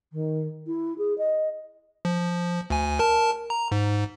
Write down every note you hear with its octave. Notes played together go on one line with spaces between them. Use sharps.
D#3
E4
G#4
D#5
F3
D2 G#5
A#4 A5
A#5
G#2